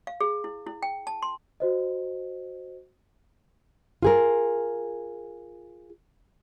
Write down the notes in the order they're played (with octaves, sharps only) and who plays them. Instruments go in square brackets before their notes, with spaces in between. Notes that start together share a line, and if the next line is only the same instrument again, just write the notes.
[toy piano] F5
G#4
E4
E4
G5
A5
C6
[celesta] F#4 C5 D#5
[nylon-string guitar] F4 G#4 A#4